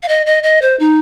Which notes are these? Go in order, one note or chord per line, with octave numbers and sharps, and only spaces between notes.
F5
D#5
D#5
D#5
C5
D#4